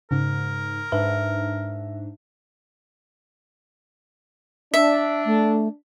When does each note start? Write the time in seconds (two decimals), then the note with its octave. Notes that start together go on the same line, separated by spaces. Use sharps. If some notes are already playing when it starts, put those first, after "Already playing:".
0.11 G#2 C#3 A#4
0.92 G#2 D4 B4 E5
4.74 D4 E5
5.26 A3